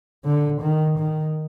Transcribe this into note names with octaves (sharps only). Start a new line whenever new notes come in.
D3
D#3
D#3